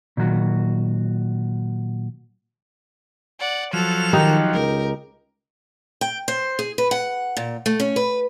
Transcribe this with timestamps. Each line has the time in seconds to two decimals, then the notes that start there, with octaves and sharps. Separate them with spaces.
0.17 A#2 D#3 F#3 F#4
3.40 D5 F#5
3.73 F3 F#3 A4 F7
4.13 D#3 D#4 G4
4.53 C#2 A#4
6.01 G5
6.28 C5
6.59 G#4
6.78 B4
6.91 F#5
7.37 A#2
7.66 A3
7.80 C#4
7.96 B4